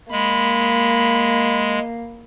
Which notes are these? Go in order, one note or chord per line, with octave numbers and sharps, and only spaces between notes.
G#3 A#3 B5